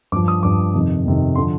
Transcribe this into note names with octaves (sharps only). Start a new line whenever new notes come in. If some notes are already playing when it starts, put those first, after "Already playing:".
G2 F3 D6
D#6
G2 F3 D6
F2 C3 D#3
F2 C3 D#3
D3 F3 C6